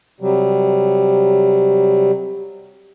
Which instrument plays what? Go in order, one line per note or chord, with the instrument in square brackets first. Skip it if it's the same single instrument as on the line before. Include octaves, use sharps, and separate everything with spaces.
[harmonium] C3 F#3 G3